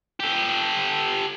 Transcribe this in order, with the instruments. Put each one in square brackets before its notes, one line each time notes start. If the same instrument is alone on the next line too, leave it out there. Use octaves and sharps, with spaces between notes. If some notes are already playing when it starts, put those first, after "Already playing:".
[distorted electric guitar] G4 A4